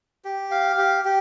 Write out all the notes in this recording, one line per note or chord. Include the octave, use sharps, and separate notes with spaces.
G4
F5
G4
G4